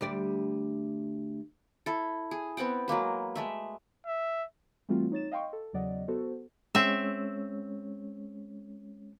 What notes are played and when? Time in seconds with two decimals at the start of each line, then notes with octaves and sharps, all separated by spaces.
0.01 D2 G3 D5
1.86 E4 A4
2.31 G#4
2.57 B3 C4 F#5 G5
2.88 F#3 G#3 A#3 B4
3.36 G#3 A3 E5
4.07 E5
4.89 E3 G3 A3 C4 F4 F#4
5.12 D#4 C#5 A6 E7
5.32 D#5 F5 G5 C6 C#6
5.53 A4
5.73 E2 C#3 F#3 D5 D#5 F#5
6.08 B3 F#4 A4 C5
6.75 G#3 C4 C#4 C#5 E5